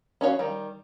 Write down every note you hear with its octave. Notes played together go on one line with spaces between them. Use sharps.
C#4 F#4 C#5 F5
D#3 G3